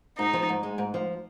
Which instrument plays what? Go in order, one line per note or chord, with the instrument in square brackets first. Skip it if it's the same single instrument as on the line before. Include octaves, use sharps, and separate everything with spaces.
[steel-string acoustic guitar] G#2 [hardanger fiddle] D#4
[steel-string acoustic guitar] F3
G#2
G#3
G#2
F3